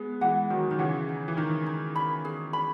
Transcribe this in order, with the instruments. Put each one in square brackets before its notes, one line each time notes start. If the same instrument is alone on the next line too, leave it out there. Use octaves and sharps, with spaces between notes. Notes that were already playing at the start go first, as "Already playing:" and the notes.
Already playing: [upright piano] G#3 B3 [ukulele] G#4
[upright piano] E3 G#3 [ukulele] F#5
[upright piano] D#3 F#3 [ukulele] D#4
[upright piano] D#3
[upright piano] C#3 E3 [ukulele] F#5
[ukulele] D#4
[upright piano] E3
[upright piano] D#3 [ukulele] D#4
[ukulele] D#4
B5
G#4
B5